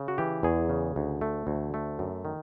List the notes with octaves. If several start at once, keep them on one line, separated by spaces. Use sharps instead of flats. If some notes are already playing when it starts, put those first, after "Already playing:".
Already playing: C#3
F#4
E3 G4
E2 G#4
C#3
D2
A3
D2
A3
F#2
D#3